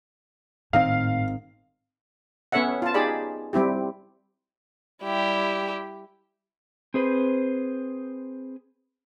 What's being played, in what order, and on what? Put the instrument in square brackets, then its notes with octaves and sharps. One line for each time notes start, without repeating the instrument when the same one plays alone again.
[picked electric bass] G#1 D#3 C4 [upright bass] A2 [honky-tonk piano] F5
[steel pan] B3 C#4 A4 C#5 E5 F#5
F4 A5
D#4 G4 G#4 D5 B5
G3 C4 E4 G4
[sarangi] G3 [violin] E4 G4
[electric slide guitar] C4 G#4 B4 C5